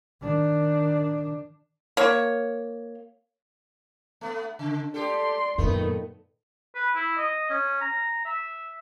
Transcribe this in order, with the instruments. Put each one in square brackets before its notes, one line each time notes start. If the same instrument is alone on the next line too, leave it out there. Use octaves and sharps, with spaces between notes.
[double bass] D#3 D4
[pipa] A#3 C#5
[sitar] A3 B3
C#3
[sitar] G4 A4 [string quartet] D5 C6
[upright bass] F#2 [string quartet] A#2 D#3 B3 [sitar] A3
[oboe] B4
E4
D#5
C#4
A#5
E5